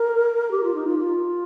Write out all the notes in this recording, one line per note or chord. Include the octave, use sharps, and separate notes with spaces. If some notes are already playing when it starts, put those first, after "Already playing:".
Already playing: A#4
G4
F4
D#4
F4
F4